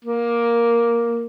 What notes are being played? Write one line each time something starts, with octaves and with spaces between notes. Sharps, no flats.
A#3